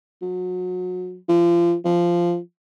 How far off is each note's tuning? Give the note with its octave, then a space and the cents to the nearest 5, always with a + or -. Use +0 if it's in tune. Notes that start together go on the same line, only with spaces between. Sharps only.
F#3 -30
F3 -30
F3 -10